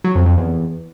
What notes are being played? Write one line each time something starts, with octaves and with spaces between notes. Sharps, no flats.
F#3
F2
F2
E2